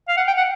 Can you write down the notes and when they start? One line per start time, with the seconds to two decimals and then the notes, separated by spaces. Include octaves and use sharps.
0.08 F5
0.17 F#5
0.27 G5
0.38 F#5